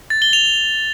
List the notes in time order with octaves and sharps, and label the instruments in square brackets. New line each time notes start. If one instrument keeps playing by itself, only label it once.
[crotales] A6
G7
F7